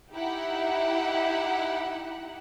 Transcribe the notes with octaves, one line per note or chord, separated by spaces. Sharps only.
D#4 E4 G4 E5 F#5